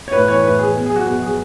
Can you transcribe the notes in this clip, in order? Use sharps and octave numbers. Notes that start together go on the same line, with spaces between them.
C#5
A2 B4
E3 C#5
A2 B4
E3 G#4
B2
F#3 G#4
F#4
B2 F#4
F#3 G#4